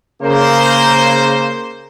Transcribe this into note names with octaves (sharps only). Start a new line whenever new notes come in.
C#3 A#3 C5